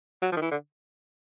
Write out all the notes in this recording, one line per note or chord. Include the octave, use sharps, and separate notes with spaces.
F#3
F3
D#3
E3
D3